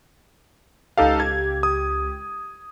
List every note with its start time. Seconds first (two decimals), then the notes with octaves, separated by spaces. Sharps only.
0.97 C#2 D#4 G4 A4 F5
1.20 G#6
1.63 D#6